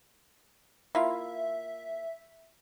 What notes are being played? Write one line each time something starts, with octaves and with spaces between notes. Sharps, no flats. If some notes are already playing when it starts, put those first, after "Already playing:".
A#3 E4 F4 E5